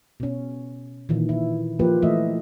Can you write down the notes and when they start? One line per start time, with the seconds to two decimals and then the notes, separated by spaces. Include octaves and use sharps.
0.20 B2 C#4
1.09 A#2 D#3 E3
1.29 E4
1.79 F3 A#3 F4 G4 B4
2.02 E3 A3 D#5 E5